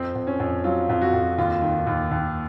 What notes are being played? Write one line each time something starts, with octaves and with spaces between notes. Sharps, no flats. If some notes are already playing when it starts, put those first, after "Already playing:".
Already playing: F2 C4
F2
C#4
F2
F#3 F4
F2 F4
F#4
F2
D#2 F4
D#3
D#2
D#2